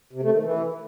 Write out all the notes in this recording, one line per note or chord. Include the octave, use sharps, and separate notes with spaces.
C3
A3
D#3
E3